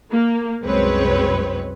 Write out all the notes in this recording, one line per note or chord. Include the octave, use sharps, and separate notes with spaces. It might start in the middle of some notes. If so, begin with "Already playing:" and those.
A#3
C2 F#2 G#3 C4 B4 C#5